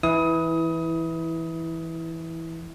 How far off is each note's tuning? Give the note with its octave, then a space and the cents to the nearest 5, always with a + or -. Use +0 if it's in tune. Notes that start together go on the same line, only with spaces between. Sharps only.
E3 +0 E4 -15 D#6 +25